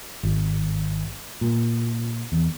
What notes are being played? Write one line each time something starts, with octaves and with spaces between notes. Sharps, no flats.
G#1
A#2
E2